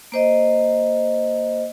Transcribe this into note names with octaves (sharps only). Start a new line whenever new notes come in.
A#3 C5 D#5